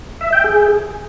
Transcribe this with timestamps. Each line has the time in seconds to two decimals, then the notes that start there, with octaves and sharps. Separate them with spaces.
0.21 E5
0.33 G5
0.44 G#4